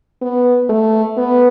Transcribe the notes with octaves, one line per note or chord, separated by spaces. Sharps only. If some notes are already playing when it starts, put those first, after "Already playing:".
B3
A3
B3